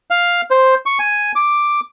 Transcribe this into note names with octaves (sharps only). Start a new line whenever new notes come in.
F5
C5
C#6
G#5
D6